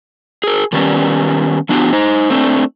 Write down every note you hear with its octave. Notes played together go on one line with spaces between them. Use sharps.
G#4 A#4
D#3 G3 B3 C#4
F3 B3 D4 F#4 G4
D#4 C5
A3 C4 D4